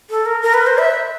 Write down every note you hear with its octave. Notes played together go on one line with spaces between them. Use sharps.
A4
A#4
A#4
B4
C5
E5